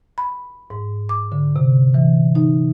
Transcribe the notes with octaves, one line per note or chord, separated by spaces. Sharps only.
B5
G#2
D6
D3
C3
E3
D#4